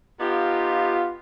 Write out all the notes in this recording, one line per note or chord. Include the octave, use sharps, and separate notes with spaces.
B3 D#4 F4 G4